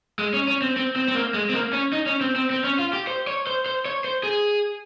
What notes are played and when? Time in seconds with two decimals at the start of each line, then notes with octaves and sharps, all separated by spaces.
0.19 G#3
0.33 C#4
0.48 C#4
0.62 C4
0.77 C4
0.96 C4
1.08 C4
1.15 A#3
1.34 G#3
1.50 C4
1.54 A#3
1.73 C#4
1.93 D#4
2.07 C#4
2.21 C4
2.36 C4
2.50 C4
2.64 C#4
2.79 F4
2.93 G4
3.07 C5
3.27 C#5
3.47 C5
3.66 C5
3.85 C#5
4.04 C5
4.23 G#4